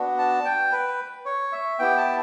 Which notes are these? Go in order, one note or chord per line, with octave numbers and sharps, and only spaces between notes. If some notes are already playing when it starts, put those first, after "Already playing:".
Already playing: B3 D4 F#4
A5
G5
B4
C#5
E5
B3 E4 G4 G5
A5